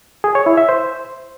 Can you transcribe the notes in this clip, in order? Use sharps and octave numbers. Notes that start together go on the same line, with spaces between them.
G#4
C#5
E4
E5
C5